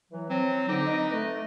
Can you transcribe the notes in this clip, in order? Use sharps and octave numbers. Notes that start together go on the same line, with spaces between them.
E3 F#3
F#3 C4
D3 D#4 D6
B4 D#5
A3